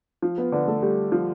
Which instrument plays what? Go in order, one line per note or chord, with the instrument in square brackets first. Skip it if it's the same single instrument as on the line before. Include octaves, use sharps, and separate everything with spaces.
[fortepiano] F3
[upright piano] B3 B4
[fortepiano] D3 [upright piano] B3 B4
[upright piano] A3 A4
[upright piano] G3 G4 [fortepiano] A3
[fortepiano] F3